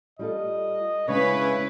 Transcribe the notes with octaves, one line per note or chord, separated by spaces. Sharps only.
G3 F4 A4 D#5
C#3 G#3 C#4 D4 E4 B4 C#5